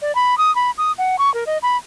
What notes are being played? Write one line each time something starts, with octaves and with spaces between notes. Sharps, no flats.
D5
B5
D#6
B5
D#6
F#5
C#6
A#4
D#5
B5